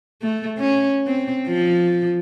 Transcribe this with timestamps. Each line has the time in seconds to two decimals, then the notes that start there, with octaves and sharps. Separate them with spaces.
0.22 A3
0.58 C#4
1.07 C4
1.48 F3